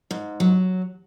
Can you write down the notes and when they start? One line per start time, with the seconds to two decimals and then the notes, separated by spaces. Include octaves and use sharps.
0.11 G#2
0.40 F#3